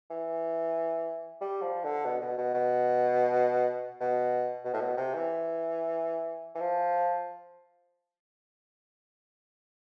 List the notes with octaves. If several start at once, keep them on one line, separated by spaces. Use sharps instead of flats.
E3
G3
F3
D3
B2
B2
B2
B2
B2
B2
A2
B2
C3
E3
E3
F3